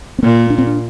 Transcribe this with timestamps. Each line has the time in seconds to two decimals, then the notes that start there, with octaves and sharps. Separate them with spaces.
0.19 C4
0.23 A#2 A#3
0.50 D4
0.58 C4
0.67 D4